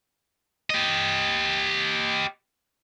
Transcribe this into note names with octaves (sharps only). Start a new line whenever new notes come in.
G4 D#5